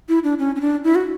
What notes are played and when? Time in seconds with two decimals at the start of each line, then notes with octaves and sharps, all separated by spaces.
0.09 E4
0.24 D4
0.39 C#4
0.55 C#4
0.61 D4
0.84 E4
0.95 F#4